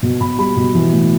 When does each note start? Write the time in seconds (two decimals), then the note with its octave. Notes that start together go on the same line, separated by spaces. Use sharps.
0.03 B2
0.21 B2 B5
0.38 G3 B5
0.56 B2
0.75 E3
0.93 A2